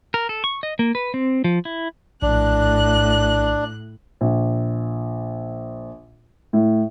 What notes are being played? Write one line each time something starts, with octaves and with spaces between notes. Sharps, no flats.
A#4
A4
C#6
D#5
A#3
B4
C4
F3
E4
A#1 A2 D4 F#6
A#1
A2